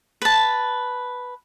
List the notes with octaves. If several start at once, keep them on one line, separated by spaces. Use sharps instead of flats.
B4 A5